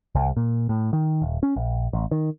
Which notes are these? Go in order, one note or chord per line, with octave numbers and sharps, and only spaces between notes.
C2
A#2
A2
D#3
D#1
C#4
A#1
A1
D#3